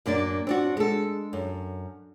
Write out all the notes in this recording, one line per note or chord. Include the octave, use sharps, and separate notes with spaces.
F#2 A#3 D4 D5
C4 D4 F#4
G#3 A4
F#2